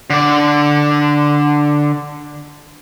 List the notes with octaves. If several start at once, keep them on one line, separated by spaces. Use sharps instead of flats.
D3 D5